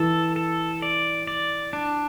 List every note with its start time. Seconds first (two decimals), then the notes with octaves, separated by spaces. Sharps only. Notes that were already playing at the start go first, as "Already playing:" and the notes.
Already playing: E3 A4
0.36 A4
0.82 D5
1.27 D5
1.73 D4